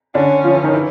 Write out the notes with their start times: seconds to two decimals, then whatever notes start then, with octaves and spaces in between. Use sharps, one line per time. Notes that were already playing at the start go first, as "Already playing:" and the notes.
0.15 D3 C#4 D4
0.44 F3 F4
0.54 E3 E4
0.64 D#3 D#4
0.73 E3 E4